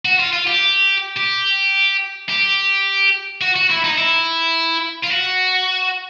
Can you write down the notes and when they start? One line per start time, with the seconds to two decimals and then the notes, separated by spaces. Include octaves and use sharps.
0.05 F#4
0.20 F4
0.33 F4
0.47 G4
1.17 G4
2.30 G4
3.42 F#4
3.56 F#4
3.70 E4
3.84 D#4
3.98 E4
5.03 F4
5.10 F#4